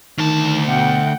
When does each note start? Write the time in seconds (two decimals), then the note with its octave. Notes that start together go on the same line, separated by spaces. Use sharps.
0.18 D2 D#3 A5
0.67 B2 F#5 G5